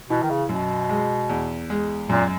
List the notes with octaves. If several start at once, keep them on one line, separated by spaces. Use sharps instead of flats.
B2 E3
D#3
C#3
F#2 B2
G#3
E2
G#3
F#2 A#2